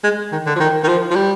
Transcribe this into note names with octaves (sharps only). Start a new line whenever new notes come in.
G#3
D#3
D3
F3
D#3
D#3
F3
F3
G3